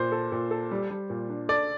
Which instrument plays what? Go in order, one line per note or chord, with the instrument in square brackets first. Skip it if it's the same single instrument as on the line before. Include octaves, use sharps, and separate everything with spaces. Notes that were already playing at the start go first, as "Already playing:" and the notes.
Already playing: [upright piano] A#2 [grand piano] C5
[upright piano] A4
A#2
A4
G3
G3
A#2
D4
[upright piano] A4 [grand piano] D5